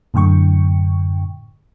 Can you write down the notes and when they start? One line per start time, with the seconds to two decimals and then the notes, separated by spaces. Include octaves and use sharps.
0.14 F#2 A2 D3 G5 C#6